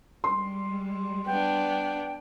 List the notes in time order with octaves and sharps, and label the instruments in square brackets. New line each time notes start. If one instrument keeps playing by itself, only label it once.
[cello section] G3 G#3 [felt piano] C6
[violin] B3 D4 [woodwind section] G5